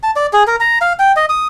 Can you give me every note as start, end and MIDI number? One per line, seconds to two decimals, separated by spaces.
0.03 0.11 81
0.16 0.27 74
0.33 0.43 68
0.47 0.56 70
0.60 0.78 82
0.81 0.93 77
0.99 1.12 79
1.16 1.25 75
1.29 1.48 87